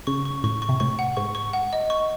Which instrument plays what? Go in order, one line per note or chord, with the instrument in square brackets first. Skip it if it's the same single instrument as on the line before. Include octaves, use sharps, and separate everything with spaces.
[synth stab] C#3 [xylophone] C#6
[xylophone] C#6
[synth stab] A2 [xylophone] C#6
[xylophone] C#6
[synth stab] C3
[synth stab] A2 [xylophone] C#6
[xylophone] F#5
[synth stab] G#2 [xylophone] C#6
[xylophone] C#6
F#5
D#5
C#6